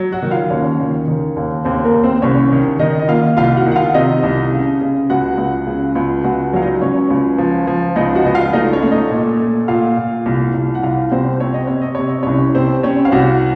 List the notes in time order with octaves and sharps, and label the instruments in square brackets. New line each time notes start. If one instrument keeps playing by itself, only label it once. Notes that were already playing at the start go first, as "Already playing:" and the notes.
Already playing: [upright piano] F#3
F#4 F#5
D#3
F4 F5
D#2 C#4 C#5
D#3
D#3
D#2
D#2 C4 C5
A#3 A#4
D#2
C4 C5
C2 C#4 C#5
D#3
D#3 D#4 D#5
D#5
A#3 F4 F5
C2 F4 F5
F#4 F#5
D#3
F#5
F4 F5
C3 D#4 D#5
C2
C#3
C#3
C#2 F#4 F#5
C#2
C#3
C#2
C#2 F#4 F#5
F#3 F5
D#4 D#5
C#2 C#4 C#5
C#2
F3
F3
C#2 D#4 D#5
F#4 F#5
C#2 D#5
F4 F5
A3 D#4 D#5
C#4 C#5
A3
D#4 D#5
A#2
A3
A#2 F4 F5
A#2
C2
C2
F#5
C2 F4 F5
C2 C4 C5
C4 C#5
D#5
C3 C#5
D#5
C3 C#5
D#5
C2 C#4 C#5
C3 C4 C5
C4 C#4 C#5
F5
C2 F#4 F#5